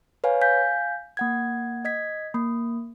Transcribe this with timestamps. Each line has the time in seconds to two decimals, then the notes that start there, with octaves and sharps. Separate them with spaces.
0.24 B4 C#5 F5 G#5
0.41 F5 G#5 G6 B6
1.17 A#3 F#5 G#6
1.85 D#5 G#6 B6
2.34 A#3